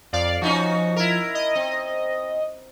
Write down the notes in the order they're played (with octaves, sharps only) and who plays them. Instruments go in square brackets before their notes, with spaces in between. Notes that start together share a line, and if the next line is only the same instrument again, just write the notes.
[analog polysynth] F2 D5 F5
[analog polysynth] F3 [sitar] C#4 D#4 F#4
[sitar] E4 A#4
[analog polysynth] D#5
[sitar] C4